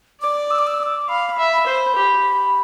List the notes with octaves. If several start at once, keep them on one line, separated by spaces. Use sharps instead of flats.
D5 D6
E6
D6
E6
E6
D6
F5 B5
E5
B5
C5
G4